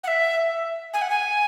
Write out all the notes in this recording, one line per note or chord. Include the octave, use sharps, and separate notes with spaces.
F#5
E5
G#5
F#5
G#5